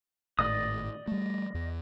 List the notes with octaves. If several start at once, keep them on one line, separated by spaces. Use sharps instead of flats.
G#1 A2 D5 D#5 D#6
G3 A3
E2